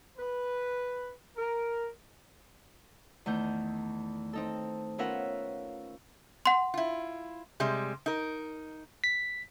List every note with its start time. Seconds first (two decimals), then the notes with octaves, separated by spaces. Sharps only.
0.17 B4
1.36 A#4
3.26 E2 D#3 A3 G6
4.33 C4 D#4 A4
4.98 B3 C#4 F4 A#4 E5 F#5
6.46 F#5 C6
6.74 E4 F4
7.60 C3 G3 G#3
8.06 D#4 A#4
9.04 B6